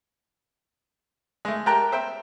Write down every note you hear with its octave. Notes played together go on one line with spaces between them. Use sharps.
G#3 A3
G4 A#4 G5 A5 A#5 F#6
C5 E5 G5